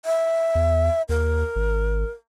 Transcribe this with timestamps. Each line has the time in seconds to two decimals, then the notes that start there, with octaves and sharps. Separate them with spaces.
0.05 E5
0.55 E2
1.09 D#2 A#4
1.56 G#1